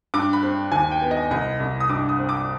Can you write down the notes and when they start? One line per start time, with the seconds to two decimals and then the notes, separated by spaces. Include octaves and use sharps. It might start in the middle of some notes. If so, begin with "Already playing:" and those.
0.14 G2 D6
0.33 B5
0.43 C4
0.72 D#2 G#5
0.91 G5
1.02 B3
1.11 D#5
1.31 C2 D#5
1.60 C2
1.80 D#6
1.89 G2 D6
2.09 D#6
2.19 C4
2.29 D6